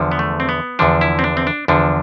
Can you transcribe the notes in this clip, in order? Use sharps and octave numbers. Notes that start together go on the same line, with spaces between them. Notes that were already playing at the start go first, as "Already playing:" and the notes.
Already playing: E2 D3 F3
B3
A3
C4
B3
E2 D3 F3 D4
E4
C4
D4
C4
D4
E2 D3 F3 D4